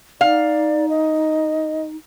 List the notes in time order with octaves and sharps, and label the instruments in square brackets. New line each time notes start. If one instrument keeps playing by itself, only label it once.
[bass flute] D#4 [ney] D5 [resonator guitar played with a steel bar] F5
[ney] D#5